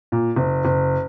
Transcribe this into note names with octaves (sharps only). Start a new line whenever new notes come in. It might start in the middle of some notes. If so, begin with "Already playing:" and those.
A#2
F#1
F#1